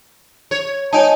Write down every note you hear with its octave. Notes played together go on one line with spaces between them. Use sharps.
C#5
D#4 C#5 G#5 A5